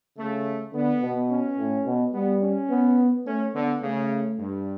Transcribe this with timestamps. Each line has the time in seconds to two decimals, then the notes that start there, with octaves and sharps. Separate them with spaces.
0.18 C#3 A3
0.74 D3 B3
1.02 B2
1.30 C#4
1.59 A2
1.86 B2
2.14 G3 B3
2.42 C#4
2.70 B3
3.26 A3 C#4
3.54 D3 B3
3.82 C#3 A3
4.38 G2